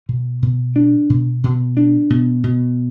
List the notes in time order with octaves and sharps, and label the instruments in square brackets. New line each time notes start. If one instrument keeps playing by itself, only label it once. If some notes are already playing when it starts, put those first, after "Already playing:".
[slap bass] B2
B2
D4
B2
B2
D4
B2
B2